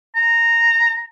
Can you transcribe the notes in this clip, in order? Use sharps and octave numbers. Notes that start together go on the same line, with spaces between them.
A#5